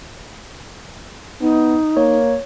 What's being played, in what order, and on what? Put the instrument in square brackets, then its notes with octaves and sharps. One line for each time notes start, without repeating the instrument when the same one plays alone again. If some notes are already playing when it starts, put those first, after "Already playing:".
[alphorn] B3 [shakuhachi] D#4
[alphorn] A#3 [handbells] C#5